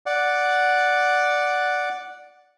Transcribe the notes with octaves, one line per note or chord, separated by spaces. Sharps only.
D5 F#5